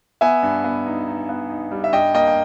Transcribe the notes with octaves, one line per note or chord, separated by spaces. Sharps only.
B3 E5 G#5
G2
B3
D#4
D#4
B3
D#4
G3
E5
G2 D#5 G5
A#3 D#5 G5
G5